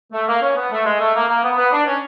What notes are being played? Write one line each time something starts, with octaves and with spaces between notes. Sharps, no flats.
A3
A#3
C#4
B3
A3
G#3
A3
A#3
A#3
B3
B3
D4
C#4